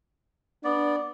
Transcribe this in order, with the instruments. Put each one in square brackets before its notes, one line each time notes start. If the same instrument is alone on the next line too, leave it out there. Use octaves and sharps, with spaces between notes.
[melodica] B3 D5 [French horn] D4